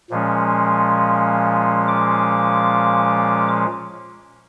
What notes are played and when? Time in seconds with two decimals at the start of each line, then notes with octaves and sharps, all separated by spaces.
0.10 A#2 F3 G#3 C#4
1.88 D6